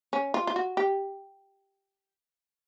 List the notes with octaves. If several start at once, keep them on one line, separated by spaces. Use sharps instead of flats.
C#4
F4
F4
F#4
G4